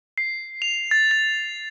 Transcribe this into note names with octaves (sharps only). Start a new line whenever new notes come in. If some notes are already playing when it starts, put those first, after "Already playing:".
C7
F7
A6
A6